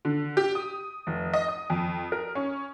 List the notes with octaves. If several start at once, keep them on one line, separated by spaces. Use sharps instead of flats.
D3
G4
D#6
F1
D#5
D#6
F2
A#4
C#4